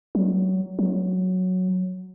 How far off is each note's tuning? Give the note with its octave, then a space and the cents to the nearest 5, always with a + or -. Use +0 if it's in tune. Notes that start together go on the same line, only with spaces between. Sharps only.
F#3 +20
F#3 -5